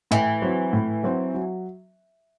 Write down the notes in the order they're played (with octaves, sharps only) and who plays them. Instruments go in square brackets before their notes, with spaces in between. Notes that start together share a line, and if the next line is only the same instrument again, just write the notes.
[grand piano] A2 [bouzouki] E3
[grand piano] F#3 C4 F#4
A2
F#3 C4 F#4
F#3